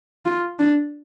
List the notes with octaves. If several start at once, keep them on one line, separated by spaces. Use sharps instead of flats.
F4
D4